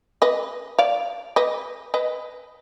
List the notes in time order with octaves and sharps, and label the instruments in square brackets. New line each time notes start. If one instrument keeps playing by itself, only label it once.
[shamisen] B4 D#5
D5 F5
B4 D#5
B4 D#5